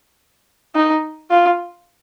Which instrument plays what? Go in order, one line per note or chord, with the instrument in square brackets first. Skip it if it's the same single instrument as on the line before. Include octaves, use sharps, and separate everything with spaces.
[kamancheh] D#4
F4